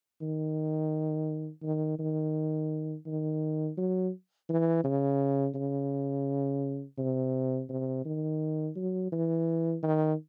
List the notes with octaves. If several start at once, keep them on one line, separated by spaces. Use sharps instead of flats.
D#3
D#3
D#3
D#3
F#3
E3
C#3
C#3
C3
C3
D#3
F#3
E3
D#3